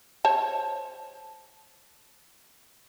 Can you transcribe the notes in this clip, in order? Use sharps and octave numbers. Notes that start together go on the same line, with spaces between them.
C5 C#5 A5